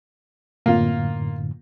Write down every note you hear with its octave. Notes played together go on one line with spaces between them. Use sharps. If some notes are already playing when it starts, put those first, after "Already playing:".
F#2 A2 D3 A#3 F4